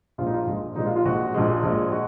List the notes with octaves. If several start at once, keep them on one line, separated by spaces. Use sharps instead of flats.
A#1 A#2 G#3 F4
D#4
F4
A#1 A#2 G#3
A#1 A#2 G#3 D#4
F4
F4
A#1 A#2 G#3 F#4
A#1 A#2 G#3
A#1 A#2 G#3
G#3 F#4